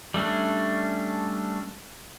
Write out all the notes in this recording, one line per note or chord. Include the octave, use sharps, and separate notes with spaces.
G3 A3 C#4 D4